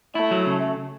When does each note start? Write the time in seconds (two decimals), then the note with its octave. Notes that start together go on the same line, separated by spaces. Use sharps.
0.15 A3 E4
0.31 F#3
0.46 C#3